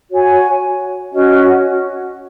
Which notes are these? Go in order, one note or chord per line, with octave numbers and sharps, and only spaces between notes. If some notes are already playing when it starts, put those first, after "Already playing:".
F#4 C#5 G#5
C#4 F#4 D#5